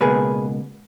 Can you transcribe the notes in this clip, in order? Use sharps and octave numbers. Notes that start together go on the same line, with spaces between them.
C#2 B2 A#3 G#4 B4